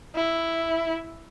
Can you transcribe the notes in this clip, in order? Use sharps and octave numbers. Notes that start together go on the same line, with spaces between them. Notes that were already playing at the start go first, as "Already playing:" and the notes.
E4